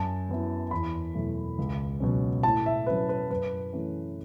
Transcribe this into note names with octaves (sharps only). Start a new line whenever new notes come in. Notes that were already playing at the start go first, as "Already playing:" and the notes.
Already playing: F#2 A5
F#3 B3 E4
E2 B5
B2 F#3 A3 E4
C#2
B2 F#3 C#4
A2 A5
E5
F#3 C#4 E4 B4
B4
F#2 B4
E3 A3 C#4 E4